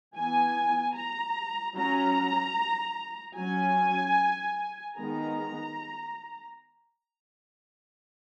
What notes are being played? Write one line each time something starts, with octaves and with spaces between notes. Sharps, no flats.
E3 B3 G#5
A#5
F#3 C#4 A#5
F#3 C#4 G#5
D#3 G#3 B3 A#5